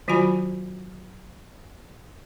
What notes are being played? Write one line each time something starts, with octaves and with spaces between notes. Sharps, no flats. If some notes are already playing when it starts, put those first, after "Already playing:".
D#3 F#3 F4 F#4 G#5 B5